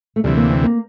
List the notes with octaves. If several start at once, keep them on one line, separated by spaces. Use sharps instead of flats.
A3
D2 C3 E3 G3
A#3
C4
A#3